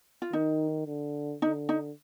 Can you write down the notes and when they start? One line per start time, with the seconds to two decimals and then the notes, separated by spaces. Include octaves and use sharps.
0.22 F4
0.33 D#3 D#4
0.87 D3
1.42 D3 D#4
1.69 D#4